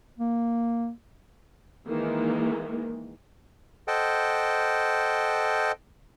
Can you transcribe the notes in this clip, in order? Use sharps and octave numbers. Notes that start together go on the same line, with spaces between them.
A#3
D#3 E3 G#3 A#3
A4 C5 D#5 F#5 G5